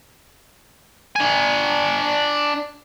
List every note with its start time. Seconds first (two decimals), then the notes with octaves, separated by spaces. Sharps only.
1.16 D4 G#5